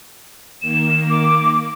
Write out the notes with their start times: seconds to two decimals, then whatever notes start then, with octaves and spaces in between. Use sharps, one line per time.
0.62 D#3 A#3 E7
1.10 D6